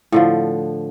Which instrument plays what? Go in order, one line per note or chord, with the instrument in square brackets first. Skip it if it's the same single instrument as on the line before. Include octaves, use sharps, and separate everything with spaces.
[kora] A2 D3 F3